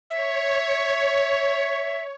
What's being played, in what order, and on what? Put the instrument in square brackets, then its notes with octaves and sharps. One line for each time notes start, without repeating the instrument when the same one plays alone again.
[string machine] C#5 [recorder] E5